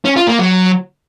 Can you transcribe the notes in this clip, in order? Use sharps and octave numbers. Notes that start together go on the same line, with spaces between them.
C#4
F4
A#3
F#3